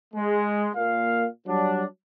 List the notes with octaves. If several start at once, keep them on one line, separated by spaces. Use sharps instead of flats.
G#3
A#2 A#3 F5
F#3 G3 D4